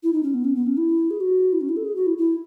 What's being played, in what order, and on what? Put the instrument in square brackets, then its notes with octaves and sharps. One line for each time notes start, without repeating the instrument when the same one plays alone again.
[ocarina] E4
D#4
C#4
B3
C#4
B3
C#4
E4
G#4
F#4
E4
C#4
E4
A4
G#4
F#4
E4
E4